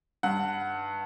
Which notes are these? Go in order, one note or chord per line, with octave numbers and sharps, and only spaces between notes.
G2 F#5